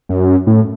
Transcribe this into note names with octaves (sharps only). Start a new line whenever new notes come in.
F#2
A2